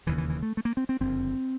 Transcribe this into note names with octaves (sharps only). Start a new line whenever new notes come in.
E1 D#2 C#3 E3
E3
E3
A3
A3
A#3
C4
C4
F#1 F2 D3 C4